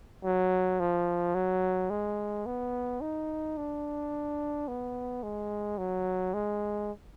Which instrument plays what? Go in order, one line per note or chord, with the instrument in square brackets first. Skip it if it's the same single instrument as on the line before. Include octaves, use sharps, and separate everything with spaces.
[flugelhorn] F#3
F3
F#3
G#3
B3
D#4
D4
B3
G#3
F#3
G#3